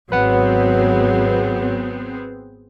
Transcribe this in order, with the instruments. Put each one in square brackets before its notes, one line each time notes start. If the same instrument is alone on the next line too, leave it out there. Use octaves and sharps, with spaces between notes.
[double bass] G#1 F#3 [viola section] B3 C4 G#4 [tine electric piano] B4 F#5